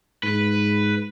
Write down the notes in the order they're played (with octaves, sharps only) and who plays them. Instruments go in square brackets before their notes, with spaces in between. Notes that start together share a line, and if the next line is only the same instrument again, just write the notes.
[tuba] G#2 [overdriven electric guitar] B4